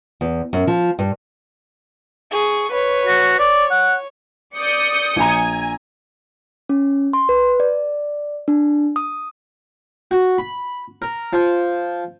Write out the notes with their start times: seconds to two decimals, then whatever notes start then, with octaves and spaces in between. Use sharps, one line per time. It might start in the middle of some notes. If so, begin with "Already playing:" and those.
0.21 E2
0.53 F#2
0.67 F3
0.99 G2
2.32 G#4 C#6
2.72 B4 C#5
3.06 F#4
3.39 C#5 D5
3.71 F#5
4.57 D5 D#6 G6 C#7
5.16 A#1 G#5 A#5
6.69 C#4
7.13 C6
7.29 B4
7.60 D5
8.48 D4
8.96 D#6
10.11 F#4
10.38 B5
11.02 A#4
11.33 F3